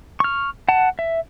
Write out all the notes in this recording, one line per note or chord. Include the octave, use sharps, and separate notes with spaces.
C#6 F6
F#5 A5
E5